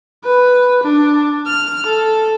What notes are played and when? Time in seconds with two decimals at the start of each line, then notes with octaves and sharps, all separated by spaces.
0.25 B4
0.83 D4
1.46 F6
1.86 A4